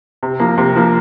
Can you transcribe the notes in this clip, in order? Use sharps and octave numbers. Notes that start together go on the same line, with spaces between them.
C3
F3 A#3
C3
F3 A#3